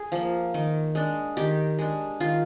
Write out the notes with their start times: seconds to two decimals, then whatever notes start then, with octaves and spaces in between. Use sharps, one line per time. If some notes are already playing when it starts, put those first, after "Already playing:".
Already playing: G#4
0.12 F3 A#3
0.54 D#3
0.95 G#3 D4
1.37 D#3 G4
1.79 G#3 D4
2.20 D#3 F4